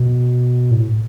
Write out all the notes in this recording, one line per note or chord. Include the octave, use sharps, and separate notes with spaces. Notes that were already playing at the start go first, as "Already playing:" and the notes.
Already playing: B2
A2